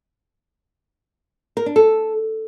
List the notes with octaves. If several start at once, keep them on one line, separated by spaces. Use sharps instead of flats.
A#4
D4
A4